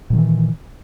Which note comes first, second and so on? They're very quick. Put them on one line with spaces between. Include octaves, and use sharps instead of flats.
A#2 F#3 D#3 E3